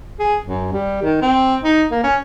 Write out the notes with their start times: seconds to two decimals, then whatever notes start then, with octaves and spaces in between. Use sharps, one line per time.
0.20 G#4
0.44 F#2
0.72 G3
1.03 D#3
1.22 C4
1.63 D#4
1.91 A#3
2.03 C#4